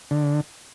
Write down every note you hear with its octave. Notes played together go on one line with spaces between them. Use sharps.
D3